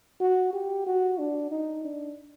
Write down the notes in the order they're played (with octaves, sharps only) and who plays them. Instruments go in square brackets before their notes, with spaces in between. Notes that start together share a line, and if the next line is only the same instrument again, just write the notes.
[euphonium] F#4
G4
F#4
D4
D#4
D4